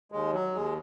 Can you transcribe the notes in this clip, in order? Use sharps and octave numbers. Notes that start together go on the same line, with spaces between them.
D#2 G#3
F#3
D#2 G#3